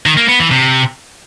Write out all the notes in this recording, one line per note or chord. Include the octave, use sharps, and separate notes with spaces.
D#3
A#3
B3
E3
C3